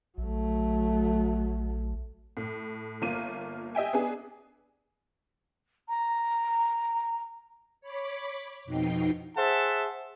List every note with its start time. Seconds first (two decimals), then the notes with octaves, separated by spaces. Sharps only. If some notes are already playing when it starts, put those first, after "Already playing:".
0.18 A#1 F#3 A3
2.37 A2
3.02 G1 A#3 F4 D#7
3.75 G4 D#5 E5 G5 G#5
3.93 B3 D4 G#4
5.88 A#5
7.81 C#5 B5 D6
8.65 F2 B2 D#4 G5 C7
9.37 G#4 C5 E5 F#5 A5